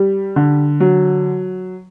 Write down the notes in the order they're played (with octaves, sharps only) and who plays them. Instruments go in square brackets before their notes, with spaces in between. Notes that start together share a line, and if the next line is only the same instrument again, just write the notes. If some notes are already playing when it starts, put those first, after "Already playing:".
Already playing: [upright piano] G3
D3
F#3